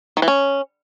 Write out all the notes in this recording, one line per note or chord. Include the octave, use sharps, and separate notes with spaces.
D#3
E3
C#4